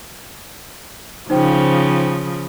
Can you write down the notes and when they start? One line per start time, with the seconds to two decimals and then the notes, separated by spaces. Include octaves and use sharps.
1.30 C#3 F3 D#4 C5 G5